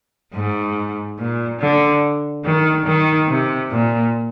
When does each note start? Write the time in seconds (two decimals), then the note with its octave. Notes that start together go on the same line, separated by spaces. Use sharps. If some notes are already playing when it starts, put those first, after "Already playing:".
0.34 G#2
1.18 A#2
1.59 D3
2.45 D#3
2.86 D#3
3.28 C3
3.70 A#2